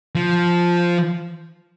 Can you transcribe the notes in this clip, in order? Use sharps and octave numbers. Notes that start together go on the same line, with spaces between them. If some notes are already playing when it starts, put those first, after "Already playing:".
F3